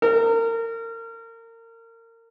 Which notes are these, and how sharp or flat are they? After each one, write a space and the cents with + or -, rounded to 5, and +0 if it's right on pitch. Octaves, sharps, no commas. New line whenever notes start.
A#4 -30